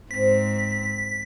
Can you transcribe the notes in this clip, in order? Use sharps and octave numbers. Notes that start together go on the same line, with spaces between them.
G#2 C4 C5 B6